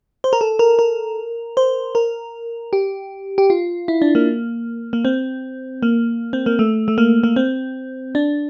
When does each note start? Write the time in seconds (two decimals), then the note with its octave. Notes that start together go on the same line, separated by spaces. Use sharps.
0.24 C5
0.33 A#4
0.41 A4
0.59 A#4
0.79 A#4
1.57 C5
1.95 A#4
2.73 G4
3.38 G4
3.50 F4
3.88 E4
4.02 D4
4.15 A#3
4.93 A#3
5.05 C4
5.83 A#3
6.33 C4
6.46 A#3
6.59 A3
6.88 A3
6.98 A#3
7.23 A#3
7.36 C4
8.15 D4